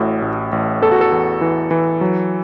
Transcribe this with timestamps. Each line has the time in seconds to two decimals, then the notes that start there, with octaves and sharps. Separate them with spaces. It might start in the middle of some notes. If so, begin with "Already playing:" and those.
Already playing: A1 A2 F#4
0.22 A1
0.52 A1
0.82 E2 A4
0.92 F#4
1.01 A4
1.12 E2
1.41 E3
1.71 E3
2.01 F#3